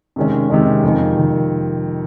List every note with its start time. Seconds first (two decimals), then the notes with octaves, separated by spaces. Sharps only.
0.16 C3 D#3 G#3 C#4
0.50 C3 D#3 G#3 C#4
0.83 F2 C3 D#3
1.17 D#3